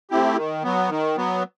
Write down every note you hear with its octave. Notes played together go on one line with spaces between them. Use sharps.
A3 C4 E4 G4
D#3
F#3 B3
D#3
F#3 B3